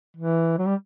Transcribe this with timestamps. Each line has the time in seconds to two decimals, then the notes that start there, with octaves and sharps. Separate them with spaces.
0.17 E3
0.58 F#3
0.67 G3